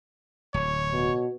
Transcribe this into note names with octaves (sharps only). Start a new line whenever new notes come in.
D1 C#5
B2